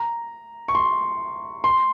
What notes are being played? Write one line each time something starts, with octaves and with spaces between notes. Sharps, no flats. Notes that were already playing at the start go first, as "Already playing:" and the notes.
Already playing: A#5
C#6
C6
C6